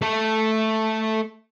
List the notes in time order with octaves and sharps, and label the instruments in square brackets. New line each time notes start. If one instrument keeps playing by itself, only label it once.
[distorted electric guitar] A3 A4